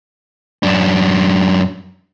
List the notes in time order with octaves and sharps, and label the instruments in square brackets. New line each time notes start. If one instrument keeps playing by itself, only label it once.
[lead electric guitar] F#2 D4